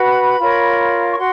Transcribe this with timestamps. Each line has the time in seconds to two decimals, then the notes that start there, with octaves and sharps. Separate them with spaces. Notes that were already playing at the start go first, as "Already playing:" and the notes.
Already playing: F#4 B4 B5
0.39 F4 A#4 C#5
1.13 C#6
1.17 F#4 C6